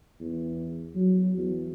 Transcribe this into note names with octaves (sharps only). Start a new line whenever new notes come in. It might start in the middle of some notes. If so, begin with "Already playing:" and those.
E2
F#3
E2